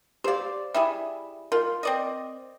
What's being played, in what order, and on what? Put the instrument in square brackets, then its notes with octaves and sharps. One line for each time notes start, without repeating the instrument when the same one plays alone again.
[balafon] G4 F5 [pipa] C5 D5
[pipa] G3 E4 G#4 [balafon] E5
[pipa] F4 [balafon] A#4
[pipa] C4 D5 D#5